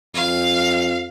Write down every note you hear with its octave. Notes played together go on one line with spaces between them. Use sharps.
F2 F5